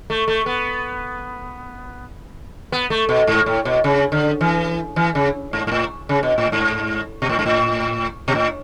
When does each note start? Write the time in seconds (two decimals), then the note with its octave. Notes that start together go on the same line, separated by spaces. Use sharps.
0.10 A3
0.28 A3
0.46 B3
2.72 B3
2.90 A3
3.09 B2
3.27 G#2
3.46 A2
3.65 B2
3.84 C#3
4.12 D3
4.41 E3
4.96 E3
5.15 C#3
5.53 G#2
5.67 G#2
5.72 A2
6.09 C#3
6.23 B2
6.38 A2
6.52 G#2
7.22 B2
7.29 A2
7.39 G#2
7.46 A2
8.28 B2
8.35 A2